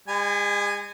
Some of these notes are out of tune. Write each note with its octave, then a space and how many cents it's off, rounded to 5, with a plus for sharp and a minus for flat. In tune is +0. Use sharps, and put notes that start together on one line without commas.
G#3 -40 G#5 +0